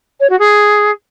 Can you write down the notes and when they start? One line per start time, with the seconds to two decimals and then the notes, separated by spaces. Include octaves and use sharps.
0.20 C#5
0.29 F#4
0.39 G#4